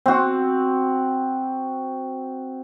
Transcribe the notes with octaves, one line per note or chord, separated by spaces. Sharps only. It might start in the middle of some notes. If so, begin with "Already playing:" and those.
C4 F#4